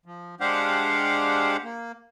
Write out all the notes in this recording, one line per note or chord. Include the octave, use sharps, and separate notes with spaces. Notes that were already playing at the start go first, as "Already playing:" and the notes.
F3
G#3 D4 G4 C5 F5 F#5
A#3